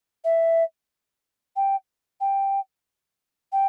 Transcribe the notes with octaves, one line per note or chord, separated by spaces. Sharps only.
E5
G5
G5
G5